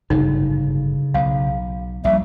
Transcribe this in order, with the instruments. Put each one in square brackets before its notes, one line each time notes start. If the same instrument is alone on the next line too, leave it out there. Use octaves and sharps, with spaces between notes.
[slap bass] G1 F#2 A2 [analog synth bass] C#3 [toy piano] D#4
[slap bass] B1 [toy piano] F5
[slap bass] A#1 [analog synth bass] G3 [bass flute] E5